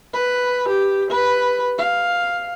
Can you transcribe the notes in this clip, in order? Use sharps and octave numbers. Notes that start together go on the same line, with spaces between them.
B4
G4
B4
F5